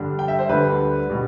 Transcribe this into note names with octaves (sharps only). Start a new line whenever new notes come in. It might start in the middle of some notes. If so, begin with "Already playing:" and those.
Already playing: G2 D3 G3 D4
G5
E5
C5
D2 D3 G3 D4 B4
B2 G3